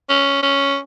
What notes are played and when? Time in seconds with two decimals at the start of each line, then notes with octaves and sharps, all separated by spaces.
0.09 C#4
0.43 C#4